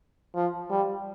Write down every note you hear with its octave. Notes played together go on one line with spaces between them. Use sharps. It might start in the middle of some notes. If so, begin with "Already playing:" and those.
F3
G3